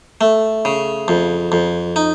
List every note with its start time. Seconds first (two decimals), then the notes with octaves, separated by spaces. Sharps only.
0.21 A3
0.65 C#3
1.08 F2
1.52 F2
1.96 D#4